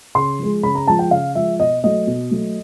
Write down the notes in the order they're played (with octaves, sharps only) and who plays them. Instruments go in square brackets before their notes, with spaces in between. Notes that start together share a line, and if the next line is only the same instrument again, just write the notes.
[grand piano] C#3 C6
F3 G#3
C#3 B5
A#5
F3 G#3 A5
G5
C#3 F5
F3 G#3 E5
B2 D#5
F#3 A3 D#5
B2
F#3 A3